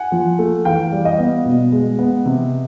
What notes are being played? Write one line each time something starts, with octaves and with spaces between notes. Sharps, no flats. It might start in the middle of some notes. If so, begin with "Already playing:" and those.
Already playing: F#5 G#5
F3
A3
E3 F5 G5
G3
D#5 F5
B3
B2
G#3
B3
C3